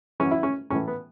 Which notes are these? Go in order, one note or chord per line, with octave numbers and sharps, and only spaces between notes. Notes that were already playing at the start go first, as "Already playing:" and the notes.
F#2 E3 C#4
E4
C#4
A2 E3 C#4
B3